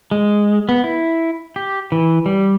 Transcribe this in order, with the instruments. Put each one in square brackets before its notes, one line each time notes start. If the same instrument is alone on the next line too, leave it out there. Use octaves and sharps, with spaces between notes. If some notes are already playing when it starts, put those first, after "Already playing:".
[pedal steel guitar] G#3
B3
E4
G4
E3
G3